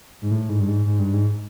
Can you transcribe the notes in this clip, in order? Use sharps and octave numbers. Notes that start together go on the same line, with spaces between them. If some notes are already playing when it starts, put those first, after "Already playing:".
G#2
A2
G#2
G2
G#2
G#2
G2
G#2